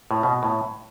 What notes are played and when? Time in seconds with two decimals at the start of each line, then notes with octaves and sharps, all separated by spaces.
0.11 A2
0.23 B2
0.43 A2